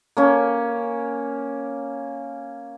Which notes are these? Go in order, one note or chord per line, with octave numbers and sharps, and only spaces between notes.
A#3 C#4